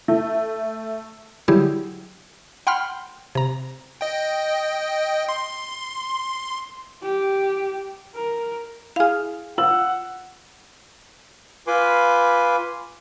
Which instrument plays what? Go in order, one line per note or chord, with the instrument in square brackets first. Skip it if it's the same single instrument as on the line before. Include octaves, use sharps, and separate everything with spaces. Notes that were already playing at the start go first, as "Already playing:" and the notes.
[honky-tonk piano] A3
[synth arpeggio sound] D3 F#3 G3 E4 G4 G#4
F#5 G5 B5 C6 F6
C3 A#5
[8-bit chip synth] D#5 G5
C6
[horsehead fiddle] G4
A#4
[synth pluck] E4 G#4 [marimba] F5 F6
[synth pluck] F4 [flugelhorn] F#5 [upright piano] E6 F#7
[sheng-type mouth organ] F4 B4 G#5 B5 C6 D6